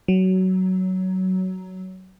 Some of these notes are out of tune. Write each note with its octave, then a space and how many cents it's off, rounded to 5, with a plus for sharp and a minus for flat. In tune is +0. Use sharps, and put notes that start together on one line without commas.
F#3 +15